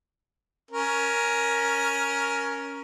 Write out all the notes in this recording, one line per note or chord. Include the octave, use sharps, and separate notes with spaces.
C#4 A#4